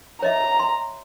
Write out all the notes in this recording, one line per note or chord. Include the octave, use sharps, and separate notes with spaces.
C#5 D#5 E5 A#5
C6